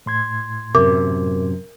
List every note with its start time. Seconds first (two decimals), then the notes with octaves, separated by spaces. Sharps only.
0.06 A2 C6 G#6
0.75 F#2 C3 A#4 D6